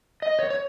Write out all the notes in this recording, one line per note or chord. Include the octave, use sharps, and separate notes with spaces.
D#5
C#5
C#5